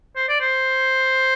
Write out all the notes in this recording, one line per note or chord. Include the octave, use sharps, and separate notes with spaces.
C5
D5
C5